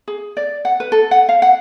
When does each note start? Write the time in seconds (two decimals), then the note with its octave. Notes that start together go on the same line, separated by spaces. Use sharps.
0.08 G#4
0.37 D5
0.65 F#5
0.80 B4
0.92 A4
1.11 F#5
1.29 F5
1.42 F#5